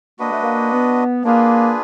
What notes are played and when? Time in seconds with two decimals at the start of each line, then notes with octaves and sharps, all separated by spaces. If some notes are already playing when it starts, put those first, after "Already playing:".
0.19 A#3 D4 F#4 B4 D#5
0.31 A3
0.43 A#3
0.72 B3
1.24 A#3 D4 F4 G#4 B4